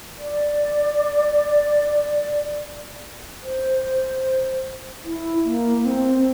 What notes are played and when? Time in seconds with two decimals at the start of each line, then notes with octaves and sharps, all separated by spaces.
0.19 D5
3.42 C5
5.05 E4
5.45 A#3
5.80 A#3
5.85 C4